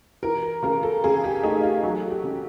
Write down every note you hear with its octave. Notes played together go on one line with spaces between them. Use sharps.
E3 A#4
C#3 A#4
A4
C#3 G#4
G4
A3 D#4
F4
F#3 F#4
G4
C#3